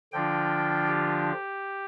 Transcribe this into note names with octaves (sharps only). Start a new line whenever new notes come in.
D3 F3 D4 F4 G5
G4